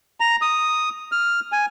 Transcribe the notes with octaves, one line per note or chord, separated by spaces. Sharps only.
A#5
D#6
F6
G#5